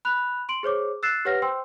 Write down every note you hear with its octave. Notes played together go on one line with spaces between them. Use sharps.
B5 F#6 F7
C6 D7 F#7
G#4 C5 C#5 D6
E6 F#6 A6 C7 E7
G4 B4 C#5 F#5 F6 A#6
C5 G5 C6 E6